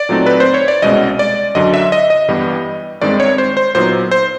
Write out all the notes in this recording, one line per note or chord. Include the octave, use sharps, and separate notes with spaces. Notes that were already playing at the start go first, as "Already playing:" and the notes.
Already playing: D5
A#2 F#3 A3 C4 D#4
B4
C5
C#5
D5
C2 B2 G#3 C#4 D#5
D5
F#2 D3 F#3 D#5
E5
D#5
D#5
G2 E3 G3 B3
G2 D#3 G#3 C4 D5
C#5
C5
C5
A#2 F#3 B3 D#4 C5
C5